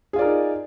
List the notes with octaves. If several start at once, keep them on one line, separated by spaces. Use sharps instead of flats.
D#4 F4 G#4 A#4 D5